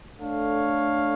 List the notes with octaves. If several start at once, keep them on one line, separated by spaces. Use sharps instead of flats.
A3 D4 A4 C#5 F5